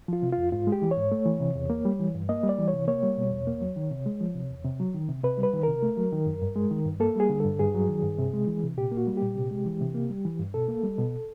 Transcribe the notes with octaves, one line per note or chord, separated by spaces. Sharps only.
F3 F4
C3
F2 F4
G#2 F4
G#3
G4
E3
C#5
G#2
A3
E3
C3
E2
A#3
G3
E3
G2
A#3 D#5
G3
D5
E3
C#5
C3
A#3 C#5
G3
B2
E2
A#3
F#3
D#3
C3
G#3
F3
C3
E2
C3
F#3
D#3
C3
C3 B4
G3
B4
D#3
C3 A#4
A3
F#3
D#3
F#2
G2
G#3
D#3
G2
A#3 A4
G3 G#4
D3
G2 A4
G2 G#4
F#3
D#3
G2
C3
G#3
E3
C3
A#2 G4
A#3
F#4
G3
A#2 G4
C3
G#3
E3
C3
A#3
G3
E3
G2
B2 A4
A#3
G3
B2